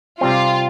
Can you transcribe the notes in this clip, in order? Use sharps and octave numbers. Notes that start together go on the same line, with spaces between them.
C3 G3 C4 F4